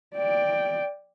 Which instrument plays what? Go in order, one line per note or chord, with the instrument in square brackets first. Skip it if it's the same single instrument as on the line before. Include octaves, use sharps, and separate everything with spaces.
[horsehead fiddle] D5 G5